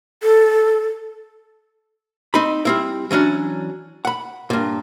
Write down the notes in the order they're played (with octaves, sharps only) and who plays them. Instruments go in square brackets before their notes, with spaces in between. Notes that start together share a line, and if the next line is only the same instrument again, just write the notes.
[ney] A4
[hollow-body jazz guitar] C4 D#4 D#5 B5
G3 C4 E4
E3 F#3 C#4 D4
F#5 B5
G2 A#2